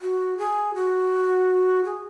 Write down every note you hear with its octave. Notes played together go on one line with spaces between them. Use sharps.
F#4
G#4
F#4
G#4